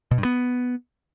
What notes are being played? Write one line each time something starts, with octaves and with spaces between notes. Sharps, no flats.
B2
G2
B3